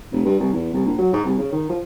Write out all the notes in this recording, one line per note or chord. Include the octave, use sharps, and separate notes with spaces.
F1
G2
C2
E2
C2
A#1
F#3
G#2
C2
C#3
D#3
F3